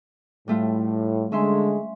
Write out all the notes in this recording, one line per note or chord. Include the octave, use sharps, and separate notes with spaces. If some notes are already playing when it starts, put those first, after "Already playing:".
A2 G3 A3 F4
D3 G#3 C#4 E5 C6